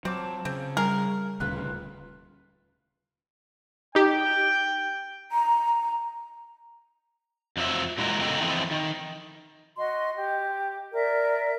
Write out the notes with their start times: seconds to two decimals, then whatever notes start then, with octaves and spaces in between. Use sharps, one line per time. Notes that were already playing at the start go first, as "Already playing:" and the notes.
0.05 F#3 C4 F4 A5 D6
0.45 C#3 C4
0.77 G3 G#4 A#4 A#5
1.40 D#1 D2 C#3 F4 B4 F#6
3.95 D#4 G4 G5
5.32 A#5
7.57 F2 F3 F#3 E5
7.98 A#2 E3 G#3 F4 F#4 A#4
8.21 C#3 B3 A4 D#5 G5
8.41 E3 F3 C4 E4 A4 D#5
8.71 D#3
9.77 F#4 D#5 C6
10.16 G4
10.93 A#4 D5 E5 A#5